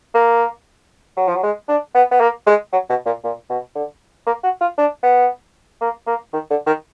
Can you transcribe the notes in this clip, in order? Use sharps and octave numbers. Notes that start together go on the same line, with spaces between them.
A#3
F#3
F3
F#3
G#3
D4
B3
B3
A#3
G#3
F#3
B2
A#2
A#2
B2
D3
A#3
F#4
F4
D4
B3
A#3
A#3
D#3
D3
D#3